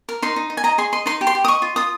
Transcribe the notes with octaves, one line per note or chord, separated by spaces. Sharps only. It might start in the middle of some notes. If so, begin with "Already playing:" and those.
A#4
D#4 C6
D#4
D#4
G#5
D#5 A#5
G#4 C6
D#5 C6
D#4 C6
G4
C6
G4
D#6
D#5 C#6
F4
F4 D#6